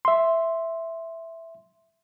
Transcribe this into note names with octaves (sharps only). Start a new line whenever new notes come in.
E5 C6